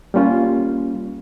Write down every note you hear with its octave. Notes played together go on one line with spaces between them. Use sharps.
G3 A#3 C#4 F4